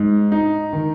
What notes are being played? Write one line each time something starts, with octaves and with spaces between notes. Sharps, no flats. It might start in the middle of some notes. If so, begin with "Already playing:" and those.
Already playing: G#2
D#4
D#3